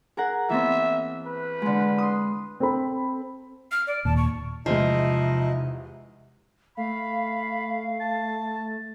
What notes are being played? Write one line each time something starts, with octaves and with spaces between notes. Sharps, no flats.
G#4 A#4 F#5
E3 B3 C4 E5
B4
D3 G#3
C6 D#6
C4 A4 B5
F6
D5
D#2 A#2 A5
C#6
E2 G#2 C3 F3 D#4 E4 D#5
A3 F5 B5
A5